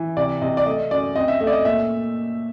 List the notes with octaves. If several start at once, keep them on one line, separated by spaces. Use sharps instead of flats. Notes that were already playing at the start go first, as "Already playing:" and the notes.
Already playing: E3
C3 D5
C3 D#5
D5
A3 D#5
F#2 D5
C4 D#5
E5
A3 E5
D5
D#5
A#2 E5